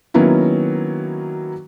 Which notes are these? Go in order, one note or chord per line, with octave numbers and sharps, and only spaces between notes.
D#3 F#3 A#3 B3 C#4 E4